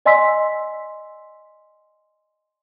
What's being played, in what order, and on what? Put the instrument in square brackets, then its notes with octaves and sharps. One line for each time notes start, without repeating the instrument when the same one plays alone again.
[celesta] D5 D#5 G#5 C6 E6 B6